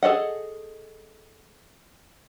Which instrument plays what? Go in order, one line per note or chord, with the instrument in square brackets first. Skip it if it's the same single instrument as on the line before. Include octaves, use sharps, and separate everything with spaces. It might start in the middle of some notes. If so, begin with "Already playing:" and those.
[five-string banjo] G#4 A4 D5 D#5 F#5